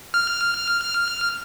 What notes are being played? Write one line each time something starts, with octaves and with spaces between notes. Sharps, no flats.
F6